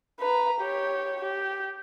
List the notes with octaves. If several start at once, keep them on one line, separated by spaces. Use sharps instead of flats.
B4 A#5
G4 C#5
G4